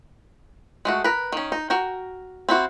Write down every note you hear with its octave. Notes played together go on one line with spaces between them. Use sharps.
G#3 A3 F#4
A#4 B4
D#3 C#4
D#4
F#4 A#4 G5
C4 E4 F#4